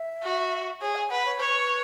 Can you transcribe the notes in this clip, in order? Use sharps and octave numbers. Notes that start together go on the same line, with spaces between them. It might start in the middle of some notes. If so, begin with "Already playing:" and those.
Already playing: E5
F#4
G#4 C#5
G#5
B4 F#5
C#5
B4 C#5